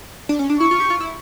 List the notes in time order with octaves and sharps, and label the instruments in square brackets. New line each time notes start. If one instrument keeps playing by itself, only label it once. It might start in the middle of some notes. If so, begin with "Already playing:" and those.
[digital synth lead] D4
C#4
D4
[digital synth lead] E4 [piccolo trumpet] C#6
[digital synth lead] F4
G4
F4
E4